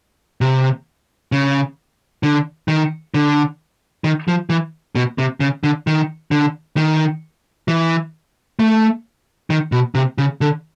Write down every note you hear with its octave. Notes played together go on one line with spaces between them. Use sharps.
C3
C#3
D3
D#3
D3
D#3
F3
E3
B2
C3
C#3
D3
D#3
D3
D#3
E3
A3
D#3
B2
C3
C#3
D3